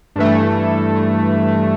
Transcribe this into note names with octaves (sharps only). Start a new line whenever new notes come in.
G2 E3 A3